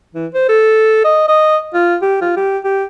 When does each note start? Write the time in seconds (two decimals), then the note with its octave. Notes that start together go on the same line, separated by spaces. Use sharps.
0.15 E3
0.34 C5
0.49 A4
1.04 D#5
1.28 D#5
1.74 F4
2.02 G4
2.21 F4
2.37 G4
2.64 G4